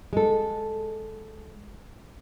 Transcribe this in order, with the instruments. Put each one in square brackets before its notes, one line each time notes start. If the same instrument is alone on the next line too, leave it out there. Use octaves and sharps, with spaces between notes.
[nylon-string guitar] G#3 A4